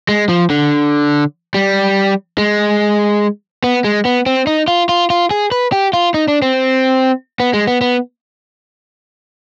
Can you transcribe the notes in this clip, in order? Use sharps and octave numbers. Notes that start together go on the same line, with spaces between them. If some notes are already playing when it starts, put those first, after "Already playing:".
G#3
F3
D3
G3
G#3
B3
G#3
B3
C4
D#4
F4
F4
F4
G#4
B4
G4
F4
D#4
D4
C4
B3
G#3
B3
B3